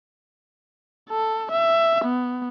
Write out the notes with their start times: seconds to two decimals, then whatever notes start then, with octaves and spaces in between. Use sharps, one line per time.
1.10 A4
1.52 E5
2.05 B3